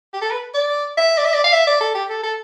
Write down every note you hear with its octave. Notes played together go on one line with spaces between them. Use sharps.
G4
A4
B4
D5
E5
D5
E5
D5
F5
E5
D5
A4
G4
A4
A4